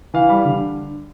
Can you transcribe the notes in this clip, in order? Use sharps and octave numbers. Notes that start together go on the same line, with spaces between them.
E3 F5
G3
D3